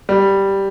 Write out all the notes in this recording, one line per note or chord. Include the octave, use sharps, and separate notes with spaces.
G3